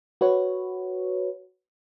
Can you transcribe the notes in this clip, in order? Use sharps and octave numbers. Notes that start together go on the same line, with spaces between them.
F#4 B4 C#5